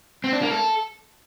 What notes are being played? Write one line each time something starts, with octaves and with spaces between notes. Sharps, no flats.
C4
D4
A#3
A4